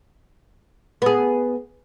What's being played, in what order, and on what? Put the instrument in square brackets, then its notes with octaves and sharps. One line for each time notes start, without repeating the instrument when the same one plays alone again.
[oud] B3 G#4